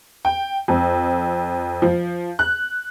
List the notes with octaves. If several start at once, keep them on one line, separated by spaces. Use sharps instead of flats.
G5
F2
F3
F#6